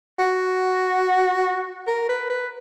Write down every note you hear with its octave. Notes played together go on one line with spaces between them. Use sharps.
F#4
A#4
B4
B4